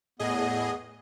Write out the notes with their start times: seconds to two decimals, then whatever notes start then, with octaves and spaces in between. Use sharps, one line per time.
0.19 E2 A2 B3 G#4 D#5